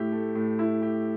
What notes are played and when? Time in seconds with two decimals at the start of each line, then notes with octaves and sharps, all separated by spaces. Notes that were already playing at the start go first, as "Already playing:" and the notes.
Already playing: A2 E4 G4
0.12 A3
0.35 A2
0.59 E4
0.82 G4